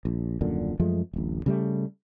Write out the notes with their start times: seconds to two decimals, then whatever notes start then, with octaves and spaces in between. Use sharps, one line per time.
0.05 A#1
0.41 D#1 F#2 A#2 D3
0.80 F#2 F3 G#3 A3
1.13 D1 A1
1.46 C#3 G3 A3